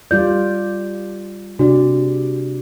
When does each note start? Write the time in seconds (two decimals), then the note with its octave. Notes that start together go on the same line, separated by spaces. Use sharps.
0.11 G3 F4 D5 G6
1.59 C3 D4 F#4 D5